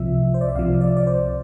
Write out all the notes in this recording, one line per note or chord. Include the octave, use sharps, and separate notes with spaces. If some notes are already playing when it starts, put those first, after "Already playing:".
Already playing: C2 C3 F3 E5
C5
D5
E5
C2 C3 F3 F5
D5
D5
C5